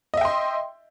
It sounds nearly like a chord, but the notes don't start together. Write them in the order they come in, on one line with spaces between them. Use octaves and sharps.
D#5 E5 G5 C6